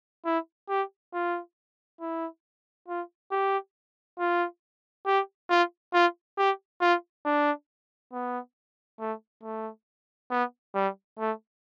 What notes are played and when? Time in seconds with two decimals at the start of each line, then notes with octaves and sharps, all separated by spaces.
0.25 E4
0.69 G4
1.13 F4
2.01 E4
2.88 F4
3.31 G4
4.19 F4
5.06 G4
5.50 F4
5.93 F4
6.38 G4
6.81 F4
7.25 D4
8.13 B3
9.00 A3
9.43 A3
10.30 B3
10.75 G3
11.18 A3